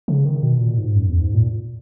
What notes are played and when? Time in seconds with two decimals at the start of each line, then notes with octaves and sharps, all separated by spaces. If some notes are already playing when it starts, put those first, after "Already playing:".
0.08 C#3
0.25 D#3
0.43 B2
0.60 A#2
0.78 G#2
0.95 F#2
1.09 E2
1.21 G#2
1.34 A#2